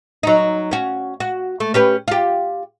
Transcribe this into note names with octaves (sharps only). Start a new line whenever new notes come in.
F#3 D#4
C#4 F#4
F#4
A3
C#4 G4 B4
F4 G4